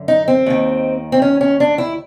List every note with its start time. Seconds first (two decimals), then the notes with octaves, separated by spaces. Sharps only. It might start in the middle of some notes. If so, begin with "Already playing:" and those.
Already playing: F#2 D3
0.08 D#4
0.28 C4
0.46 D#2 D#3
1.12 C4
1.22 C#4
1.41 C#4
1.60 D4
1.78 E4